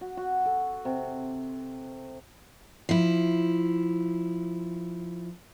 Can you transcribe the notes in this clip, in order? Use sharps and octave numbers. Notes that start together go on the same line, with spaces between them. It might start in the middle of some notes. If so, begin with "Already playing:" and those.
F#4
F#4
A4
C3
F3 E4